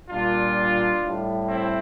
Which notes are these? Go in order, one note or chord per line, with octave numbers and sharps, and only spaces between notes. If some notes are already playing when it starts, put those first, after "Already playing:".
A#2 G3 D4 F4
A2 G3
C4 E4